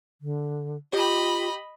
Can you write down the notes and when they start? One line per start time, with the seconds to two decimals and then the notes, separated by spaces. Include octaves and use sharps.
0.21 D3
0.93 F4 G4 D#5 B5